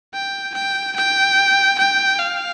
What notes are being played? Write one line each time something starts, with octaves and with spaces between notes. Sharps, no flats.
G5
G5
G5
G5
F5